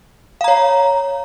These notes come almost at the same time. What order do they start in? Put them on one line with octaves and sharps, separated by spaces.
F5 A#5 C#5